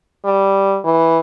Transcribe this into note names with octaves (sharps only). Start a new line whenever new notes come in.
G3
E3